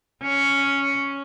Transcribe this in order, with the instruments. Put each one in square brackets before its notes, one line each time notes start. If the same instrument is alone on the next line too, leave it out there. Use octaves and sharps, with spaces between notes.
[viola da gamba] C#4